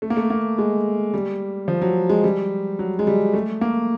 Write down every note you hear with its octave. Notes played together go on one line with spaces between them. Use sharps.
A3
A#3
A3
A#3
G#3
G3
F3
F#3
G#3
G3
F#3
G#3
G3
A3
A#3